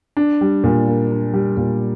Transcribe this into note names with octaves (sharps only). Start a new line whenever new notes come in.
D4
G3
A#2
A#3
D4
G3
A#2